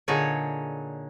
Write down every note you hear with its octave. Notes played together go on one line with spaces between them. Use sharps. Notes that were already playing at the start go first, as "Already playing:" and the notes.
A#2 D3 D#4 G#4 C#5